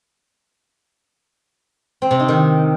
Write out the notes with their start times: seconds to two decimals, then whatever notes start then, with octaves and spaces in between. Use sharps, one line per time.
2.02 C4
2.11 C3
2.20 D#4
2.28 D#3